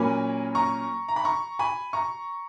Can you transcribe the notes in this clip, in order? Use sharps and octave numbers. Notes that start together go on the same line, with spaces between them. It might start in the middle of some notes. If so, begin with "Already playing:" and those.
Already playing: A#2 F#3 A#3 C#4 G#5 B5
A#5 C#6
A#5
B5
A#5 C#6
G#5 B5
A#5 C#6